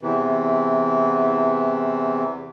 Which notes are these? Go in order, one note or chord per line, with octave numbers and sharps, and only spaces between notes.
E2 C3 E3